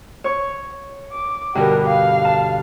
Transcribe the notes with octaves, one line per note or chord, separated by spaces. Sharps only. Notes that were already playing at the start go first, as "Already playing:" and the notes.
C#5 C#6
D6
G2 B2 D3 G4 A#4
F5
A5